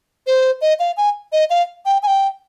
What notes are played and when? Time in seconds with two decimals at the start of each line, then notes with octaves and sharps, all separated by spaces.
0.27 C5
0.61 D#5
0.79 F5
0.97 G#5
1.32 D#5
1.50 F5
1.86 G5
2.03 G#5
2.07 G5